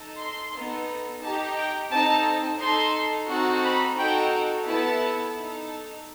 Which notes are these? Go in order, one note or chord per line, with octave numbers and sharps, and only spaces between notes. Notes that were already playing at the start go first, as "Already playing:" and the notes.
Already playing: D#4 A4
C6
B3 D#4 A4
D#4 G4 A5
G5
C4 D#4 A4 A5
D#4 A4 C6
C4 D#4 F#4 A4
B5
D#4 F#4 A4 G5
B3 E4 A4 A5
D#4 A4